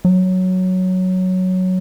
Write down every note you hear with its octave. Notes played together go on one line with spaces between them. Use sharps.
F#3